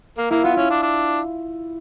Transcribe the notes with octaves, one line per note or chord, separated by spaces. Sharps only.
A#3
A#3 E4
B3 F4
C#4 E4
D4
D4